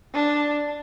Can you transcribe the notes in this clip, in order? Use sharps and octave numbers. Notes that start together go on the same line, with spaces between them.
D4